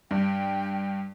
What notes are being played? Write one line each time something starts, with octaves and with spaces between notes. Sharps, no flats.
G2 G5